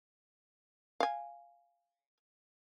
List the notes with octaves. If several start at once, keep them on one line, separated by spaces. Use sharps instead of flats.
F5 G#5